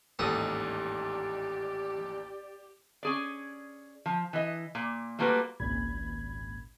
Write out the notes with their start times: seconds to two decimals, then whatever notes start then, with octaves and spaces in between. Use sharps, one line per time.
0.19 A1 D#2 G#2 G4 A4 D5 D#6
3.03 C#4 G#4 D5
4.06 F3
4.33 E3 D#5
4.75 A#2
5.19 G3 A3 A#3 F4 F#4 B4
5.60 G#1 C#2 A#2 B5 G#6